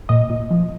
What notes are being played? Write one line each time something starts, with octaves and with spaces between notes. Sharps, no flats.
A#2 D#5
A#2
F3